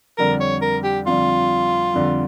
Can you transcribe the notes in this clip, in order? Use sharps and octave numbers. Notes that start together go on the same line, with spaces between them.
F2 D3 G3 A#4
C#5
A#4
G4
F2 D3 G3 F4
F2 D3 G3